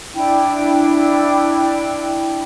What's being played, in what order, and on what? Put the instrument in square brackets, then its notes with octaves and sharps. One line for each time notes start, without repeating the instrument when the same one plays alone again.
[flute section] D4 E4 G5